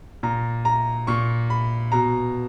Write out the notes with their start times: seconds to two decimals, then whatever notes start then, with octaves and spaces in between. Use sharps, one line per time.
0.23 A#2 A#5
0.65 A#5
1.07 A#2 C#6
1.50 B5
1.92 B2 A#5